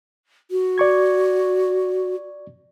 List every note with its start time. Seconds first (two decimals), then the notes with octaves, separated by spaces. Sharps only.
0.51 F#4
0.78 D5 C#6 G#6